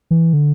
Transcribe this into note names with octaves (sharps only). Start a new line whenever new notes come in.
E3
D3